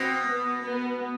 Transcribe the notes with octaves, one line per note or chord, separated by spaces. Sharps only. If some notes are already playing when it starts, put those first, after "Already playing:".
Already playing: B2 C4
B3
B3